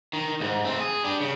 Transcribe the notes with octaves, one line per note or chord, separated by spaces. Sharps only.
D#3
D2 G#2
A3 C4
G#4
D4 G4
C#3